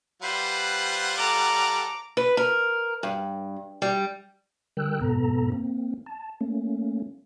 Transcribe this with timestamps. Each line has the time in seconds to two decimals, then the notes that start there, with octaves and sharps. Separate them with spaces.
0.22 G3 F4 B4 C5 F#5
1.17 A4 A#5 D6
2.17 B4
2.37 A#4
3.03 G2
3.82 G3
4.77 D3 G3 A#4 G5 E6 F#6
5.01 F2 G#2 B2 B3 A4 A#5
5.52 A#3 C4
6.06 A5
6.41 A3 A#3 C#4